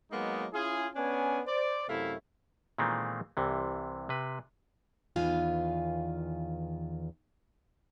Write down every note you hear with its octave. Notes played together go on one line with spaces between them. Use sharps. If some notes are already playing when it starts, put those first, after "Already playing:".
F#3 G#3 A#3 B3 D#4
C#4 E4 F4 G#4
B3 C#4 D4 G#5
C5 D5
F#2 C3 A3 E4 F5
A#2 D#3 E3 G#3 A3 C4
C2 C3 E3
C3 B4
E2 D#3 F4 B4 F5 G#5